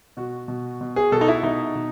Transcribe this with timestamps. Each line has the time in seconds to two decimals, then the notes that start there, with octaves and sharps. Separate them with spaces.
0.17 B2 F#4
0.48 B2
0.81 B2
0.96 G#4
1.12 B2 A4
1.21 D#4
1.28 E4
1.43 B2 D#4
1.75 B2